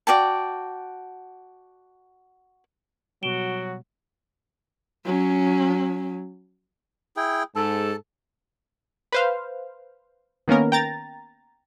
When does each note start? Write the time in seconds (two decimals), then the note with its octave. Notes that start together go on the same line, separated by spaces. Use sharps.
0.07 F#4 D5 G5 A5
3.23 B2 F#3 G3 F#4 D7 E7 G7
5.06 F#3 C#4
7.17 E4 G#4 G5
7.56 G#2 A4 A5
9.12 B4 C5 F5
10.48 D#3 A#3 B3 C#4 A#4
10.72 G5 A#5 A6